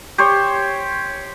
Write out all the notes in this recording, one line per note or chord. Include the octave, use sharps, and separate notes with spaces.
G4 C5 C#5